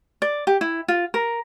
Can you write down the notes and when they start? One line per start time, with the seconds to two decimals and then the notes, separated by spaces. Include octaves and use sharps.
0.22 D5
0.47 G4
0.61 E4
0.88 F4
1.14 A#4